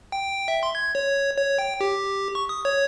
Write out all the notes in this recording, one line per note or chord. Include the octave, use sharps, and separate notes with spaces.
G5
E5
C6
G#6
C#5
C#5
G5
G4
C#6
D#6
C#5